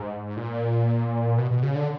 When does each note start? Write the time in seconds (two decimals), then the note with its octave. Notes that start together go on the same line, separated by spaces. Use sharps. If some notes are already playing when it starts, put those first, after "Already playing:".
Already playing: G#2
0.37 A#2
1.38 B2
1.51 B2
1.63 C#3
1.75 D3